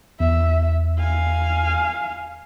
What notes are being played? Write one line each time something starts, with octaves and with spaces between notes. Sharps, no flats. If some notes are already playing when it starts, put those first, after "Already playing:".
E2 E5
F5 G#5